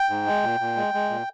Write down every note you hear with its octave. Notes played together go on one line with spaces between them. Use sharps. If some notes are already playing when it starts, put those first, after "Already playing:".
Already playing: G5
G#2
G#3
A#2
A#2
G#3
G#3
A#2